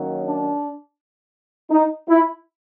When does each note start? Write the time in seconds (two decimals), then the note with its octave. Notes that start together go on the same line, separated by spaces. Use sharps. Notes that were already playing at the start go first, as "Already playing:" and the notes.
Already playing: D#3 F#3 A#3 C#4
0.24 D4
1.71 D#4
2.08 E4